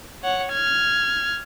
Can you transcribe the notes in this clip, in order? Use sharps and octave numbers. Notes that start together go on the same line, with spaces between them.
C#5 F#5
F6 G#6